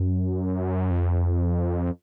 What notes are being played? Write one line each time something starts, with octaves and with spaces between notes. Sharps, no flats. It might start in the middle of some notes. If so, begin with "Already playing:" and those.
Already playing: F#2
F2